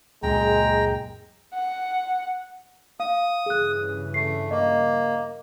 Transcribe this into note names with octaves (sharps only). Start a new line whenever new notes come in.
C#2 F#2 A#2 G#3 G#4 G5 A#5
F#5
F5 D#6
G2 C#3 E3 G#4 F#6
A3 C7
A#3 D#5